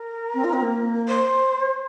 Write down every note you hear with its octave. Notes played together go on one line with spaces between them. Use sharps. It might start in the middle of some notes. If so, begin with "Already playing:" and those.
Already playing: A#4
C4
F4
C4
A#3
C5